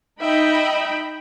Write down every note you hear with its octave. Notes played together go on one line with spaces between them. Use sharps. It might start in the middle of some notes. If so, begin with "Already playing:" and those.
D#4 D#5 E5 G5 B5